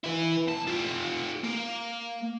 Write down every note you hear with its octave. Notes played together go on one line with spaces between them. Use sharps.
E4 B4
B1 A5
F4 G4
A#3